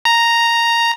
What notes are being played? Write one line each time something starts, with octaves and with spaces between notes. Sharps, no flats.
A#5